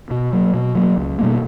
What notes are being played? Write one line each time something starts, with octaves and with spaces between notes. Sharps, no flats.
B2
F#3 A#3
B2
F#3 A#3
C#2
B2 G3 A#3